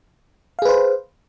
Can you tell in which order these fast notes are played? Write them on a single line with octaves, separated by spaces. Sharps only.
F5 G#4 B4 C5